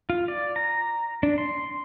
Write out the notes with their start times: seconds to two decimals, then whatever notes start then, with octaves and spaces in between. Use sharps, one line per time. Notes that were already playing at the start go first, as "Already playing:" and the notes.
0.10 F4
0.28 D5
0.56 A#5
1.23 D4
1.38 C6